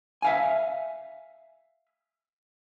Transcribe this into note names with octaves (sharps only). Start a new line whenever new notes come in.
E5 F5 G#5